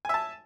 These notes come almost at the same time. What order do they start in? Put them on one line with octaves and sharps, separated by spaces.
G#5 E5 A5